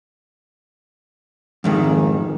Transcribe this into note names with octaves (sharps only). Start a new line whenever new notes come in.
F2 G#2 D#3